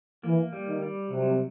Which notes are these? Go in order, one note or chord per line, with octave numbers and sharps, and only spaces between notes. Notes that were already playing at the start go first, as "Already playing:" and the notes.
E3 A#3
G3
D#3
G3
C3 F#3